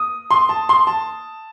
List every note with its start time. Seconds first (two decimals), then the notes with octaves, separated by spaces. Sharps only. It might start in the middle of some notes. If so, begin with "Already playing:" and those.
Already playing: D#6
0.31 C6
0.49 A5
0.69 C6
0.87 A5